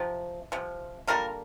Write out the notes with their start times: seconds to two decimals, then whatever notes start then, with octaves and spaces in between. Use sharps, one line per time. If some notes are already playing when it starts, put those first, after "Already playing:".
Already playing: C3 F3
0.52 C3 F3
1.07 D3 G3 A#3 F4 A#4